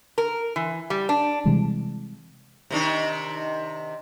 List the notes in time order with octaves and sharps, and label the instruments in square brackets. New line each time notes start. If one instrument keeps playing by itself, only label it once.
[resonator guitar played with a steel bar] A#4
E3
G3
D4
[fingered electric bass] C3 E3 G3 G#3
[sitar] C3 D#3 D4